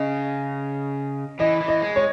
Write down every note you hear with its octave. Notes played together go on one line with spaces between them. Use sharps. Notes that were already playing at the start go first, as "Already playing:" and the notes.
Already playing: C#3 D#5
E3 D#5
E3
D#5
G#3
C#5